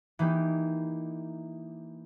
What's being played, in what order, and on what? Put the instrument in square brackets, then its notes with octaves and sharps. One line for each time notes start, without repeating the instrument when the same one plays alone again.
[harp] E3 A#3 D#4 G4